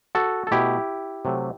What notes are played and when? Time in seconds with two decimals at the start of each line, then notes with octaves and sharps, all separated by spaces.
0.15 F#4 A4
0.47 A4
0.51 B2 A3 E4 G4
1.25 C3 F#3 A3